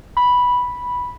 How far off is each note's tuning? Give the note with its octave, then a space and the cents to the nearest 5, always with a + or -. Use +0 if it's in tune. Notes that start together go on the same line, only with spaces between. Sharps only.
B5 -5